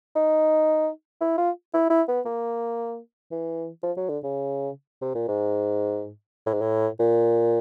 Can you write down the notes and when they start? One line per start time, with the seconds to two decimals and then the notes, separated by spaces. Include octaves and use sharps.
0.16 D#4
1.21 E4
1.38 F4
1.74 E4
1.90 E4
2.08 B3
2.25 A#3
3.32 E3
3.83 F3
3.97 F#3
4.09 D3
4.24 C#3
5.02 C3
5.15 A#2
5.28 G#2
6.47 A2
6.54 G#2
6.61 A2
7.00 A#2